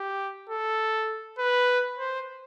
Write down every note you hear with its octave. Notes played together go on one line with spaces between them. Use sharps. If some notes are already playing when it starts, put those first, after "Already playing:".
Already playing: G4
A4
B4
C5